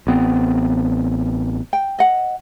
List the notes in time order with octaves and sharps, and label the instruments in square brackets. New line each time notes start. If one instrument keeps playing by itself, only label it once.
[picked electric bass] A1 B3 C4
[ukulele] G5
D#5 F#5